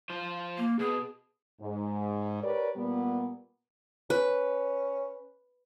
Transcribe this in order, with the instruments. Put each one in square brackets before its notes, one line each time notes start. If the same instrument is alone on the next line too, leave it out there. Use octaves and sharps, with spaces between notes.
[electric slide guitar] F3 F4 C5
[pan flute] A#3
[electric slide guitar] B2 [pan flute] G#4
[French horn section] G#2
G4 A#4 B4 C#5 D5
A#2 G3 B3
[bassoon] C#4 [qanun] B4